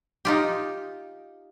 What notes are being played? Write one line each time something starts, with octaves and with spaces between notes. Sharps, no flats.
D#4 F4 G4